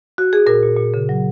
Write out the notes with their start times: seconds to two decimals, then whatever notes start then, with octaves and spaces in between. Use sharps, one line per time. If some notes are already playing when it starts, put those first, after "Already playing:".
0.18 F#4
0.33 G#4
0.46 A#2 A#4
0.63 A#2
0.77 A#2
0.94 C#3
1.09 F#3